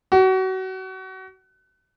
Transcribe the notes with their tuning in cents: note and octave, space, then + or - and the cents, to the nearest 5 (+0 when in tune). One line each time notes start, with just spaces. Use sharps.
F#4 +30